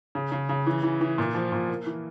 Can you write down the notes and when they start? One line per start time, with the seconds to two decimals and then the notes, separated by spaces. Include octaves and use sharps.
0.15 C#3
0.32 C#3
0.49 C#3
0.66 E3
0.83 E3
1.01 E3
1.18 A#2
1.35 F3
1.52 A#2
1.69 A#3
1.86 E3